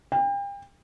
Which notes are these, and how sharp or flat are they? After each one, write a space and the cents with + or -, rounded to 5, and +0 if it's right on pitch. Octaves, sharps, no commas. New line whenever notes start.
G5 +35